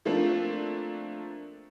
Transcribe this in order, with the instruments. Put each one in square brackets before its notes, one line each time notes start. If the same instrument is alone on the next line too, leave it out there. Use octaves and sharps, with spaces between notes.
[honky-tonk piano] F3 A3 A#3 C4 D4 F4